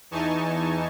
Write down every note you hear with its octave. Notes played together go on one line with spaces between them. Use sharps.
E2 E3 D#4 G#5 A5 C#6